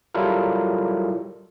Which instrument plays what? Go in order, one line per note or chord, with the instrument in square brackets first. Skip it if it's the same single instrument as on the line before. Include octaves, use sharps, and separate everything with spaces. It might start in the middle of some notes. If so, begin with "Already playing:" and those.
[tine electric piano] F#3 G3 E4 F4 A4 A#4